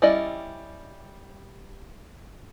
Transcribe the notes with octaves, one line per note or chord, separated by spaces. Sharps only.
G3 C#4 E4 D5 D#5